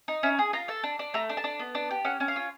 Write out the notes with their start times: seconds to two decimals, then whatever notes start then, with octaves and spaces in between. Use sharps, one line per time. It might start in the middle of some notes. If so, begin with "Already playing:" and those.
0.08 D#4
0.23 C#4 E5
0.39 G#4
0.53 F4 A#5
0.68 A4 A5
0.83 D4
0.99 D4
1.14 A3 A#5
1.29 D4
1.37 A5
1.44 D4
1.59 B3
1.75 D4
1.91 G4
2.05 C#4 F#5
2.20 C#4
2.28 F5
2.36 F4